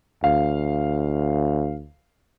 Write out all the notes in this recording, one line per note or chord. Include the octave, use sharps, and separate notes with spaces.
D2 F5